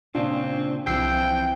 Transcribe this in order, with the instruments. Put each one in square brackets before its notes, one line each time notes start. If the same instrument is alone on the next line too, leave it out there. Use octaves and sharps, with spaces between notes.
[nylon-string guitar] A#2 [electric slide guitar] C#3 F4 [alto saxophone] C4 [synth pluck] D4
[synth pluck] C2 E6 C7 [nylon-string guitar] E3 [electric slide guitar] F3 C4 [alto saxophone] G5